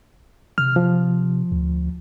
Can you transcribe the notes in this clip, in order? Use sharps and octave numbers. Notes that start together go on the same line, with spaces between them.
C3 F6
F3
D2